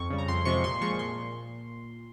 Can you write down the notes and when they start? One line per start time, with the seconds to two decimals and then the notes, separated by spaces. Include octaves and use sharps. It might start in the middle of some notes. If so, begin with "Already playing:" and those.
Already playing: F2 C#6
0.10 C#3 G3
0.18 A#5
0.28 F2 C6
0.45 C3 F3 G#3 C#6
0.64 A#2 C6
0.81 F3 G#3 C#6
0.99 A#2 C6